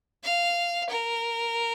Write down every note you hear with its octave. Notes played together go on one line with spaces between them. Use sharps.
F5
A#4